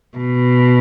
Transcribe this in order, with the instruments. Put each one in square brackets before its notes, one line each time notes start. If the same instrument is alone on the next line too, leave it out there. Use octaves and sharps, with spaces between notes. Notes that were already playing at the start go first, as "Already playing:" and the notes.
[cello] B2